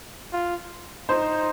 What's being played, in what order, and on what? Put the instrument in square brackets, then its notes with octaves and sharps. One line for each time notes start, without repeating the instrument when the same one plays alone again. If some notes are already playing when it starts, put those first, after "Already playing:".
[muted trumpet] F4
[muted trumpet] D#4 [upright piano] C5